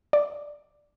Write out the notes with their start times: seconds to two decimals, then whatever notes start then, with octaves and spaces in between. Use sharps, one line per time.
0.13 D5